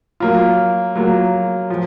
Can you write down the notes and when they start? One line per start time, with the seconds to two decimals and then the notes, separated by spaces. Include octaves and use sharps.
0.20 F#3 A#3 F4
0.95 F#3 A#3 F4
1.70 F3